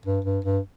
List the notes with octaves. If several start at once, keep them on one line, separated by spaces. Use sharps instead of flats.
G2
G2
G2